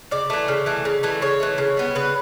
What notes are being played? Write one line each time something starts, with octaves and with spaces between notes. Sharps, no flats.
C#3 D5
E3 A3
C#3
E3 A3
C#3
E3 A3
C#3 C#5
E3 A3
C#3
G3 B3
C#3 B4